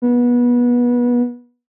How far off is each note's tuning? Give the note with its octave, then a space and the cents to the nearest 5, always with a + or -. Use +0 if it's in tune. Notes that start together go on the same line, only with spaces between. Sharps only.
B3 -25